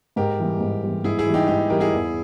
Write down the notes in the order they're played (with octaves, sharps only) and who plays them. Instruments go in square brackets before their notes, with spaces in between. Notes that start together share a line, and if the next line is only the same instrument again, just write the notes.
[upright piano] G#2 [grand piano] G4 A#4
[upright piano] E3 G3
G#2
E3 G3
[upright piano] G#2 [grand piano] E4 G#4
[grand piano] E4 G#4
[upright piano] E3 G3
[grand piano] D#4 G4
[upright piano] G#2 [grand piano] D#4 G4
[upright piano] E3 G3 [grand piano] G4 A#4
[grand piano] E4 G#4
[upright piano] E2